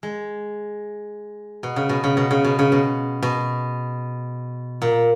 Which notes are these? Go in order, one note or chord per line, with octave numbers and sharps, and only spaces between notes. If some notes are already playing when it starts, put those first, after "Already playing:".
G#3
B2
C#3
B2
C#3
B2
C#3
B2
C#3
B2
B2
A#2